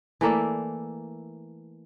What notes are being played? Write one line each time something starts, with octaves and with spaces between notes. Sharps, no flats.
E3 A3 A#3 D5